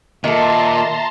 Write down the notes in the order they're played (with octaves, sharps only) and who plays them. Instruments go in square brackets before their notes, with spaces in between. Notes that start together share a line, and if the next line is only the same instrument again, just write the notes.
[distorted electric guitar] A#2 [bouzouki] D#3 A4 [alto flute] E5 [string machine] A5 A#5 C6